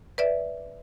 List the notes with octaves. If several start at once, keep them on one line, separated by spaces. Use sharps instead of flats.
B4 D5 E5